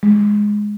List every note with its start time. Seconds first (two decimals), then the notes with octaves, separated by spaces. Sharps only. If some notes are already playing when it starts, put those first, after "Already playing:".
0.03 G#3